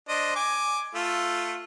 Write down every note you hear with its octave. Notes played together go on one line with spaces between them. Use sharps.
D4 C5 D#5
G#5 D6
A3 F4 A4